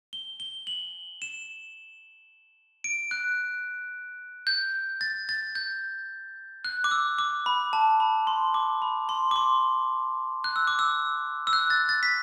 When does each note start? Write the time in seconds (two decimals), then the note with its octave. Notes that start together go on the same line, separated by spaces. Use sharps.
0.13 G7
0.40 G7
0.67 F#7
1.22 E7
2.84 D7
3.11 F#6
4.47 G6
5.01 A6
5.29 A6
5.55 G6
6.65 F#6
6.84 D6
6.91 E6
7.19 D6
7.46 B5
7.73 A5
8.00 B5
8.27 C6
8.54 D6
8.82 B5
9.09 C6
9.31 D6
9.36 C6
10.44 F#6
10.56 E6
10.67 D6
10.79 E6
11.47 E6
11.53 F#6
11.70 A6
11.89 A6
12.03 B6